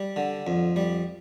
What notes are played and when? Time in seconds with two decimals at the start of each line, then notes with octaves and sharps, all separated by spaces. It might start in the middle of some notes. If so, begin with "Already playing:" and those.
Already playing: G3
0.16 D3
0.47 F2
0.76 G3